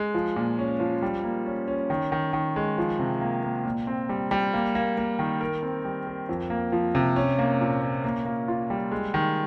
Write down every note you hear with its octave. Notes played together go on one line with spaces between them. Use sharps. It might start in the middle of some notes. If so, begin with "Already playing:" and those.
Already playing: G#3
F3
A#2
C#4
F3
G3
A#3
C#4
C#4
D#3
D#3
D#3
G#3
F3
C3
A#3
A#3
A#2
C4
G3
G3
A#3
A#3
A#3
D#3
A#4
C4
G3
A#4
F2
A#3
F3
C3
C#4
A#3
A#2
C#4
A#3
A#3
F4
G3
G#3
D#3